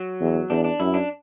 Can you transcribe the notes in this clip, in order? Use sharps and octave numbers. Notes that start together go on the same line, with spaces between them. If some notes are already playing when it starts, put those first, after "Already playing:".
Already playing: F#3
E2
E2 D4
D4
F#2 E4
D4